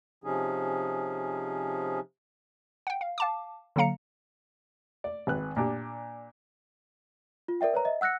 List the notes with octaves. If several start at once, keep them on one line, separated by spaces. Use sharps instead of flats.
C3 F3 C#4 D#4 G#4
F#5 G5
F5
F5 A5 D6
D3 F#3 A#3 F5 A#5 C#7
D5
G#1 B4 F#6
A#2 D4 G4
F4
A#4 D5 E5 G5
B4 C#5 A#5
D#5 E5
F#5 E6 F#6 A#6 C#7